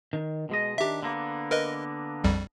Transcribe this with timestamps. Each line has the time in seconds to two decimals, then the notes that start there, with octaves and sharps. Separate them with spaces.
0.13 D#3
0.49 B2 G#3 D#5
0.78 D#3 D4 G4 E5
1.03 D3 A#3 B3
1.51 A#4 B4 D#5
2.24 A#1 F2 G3